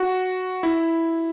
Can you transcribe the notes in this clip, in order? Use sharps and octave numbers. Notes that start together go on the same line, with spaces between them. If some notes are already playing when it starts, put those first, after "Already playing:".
Already playing: F#4
E4